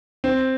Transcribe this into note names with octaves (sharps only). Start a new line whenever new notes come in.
C4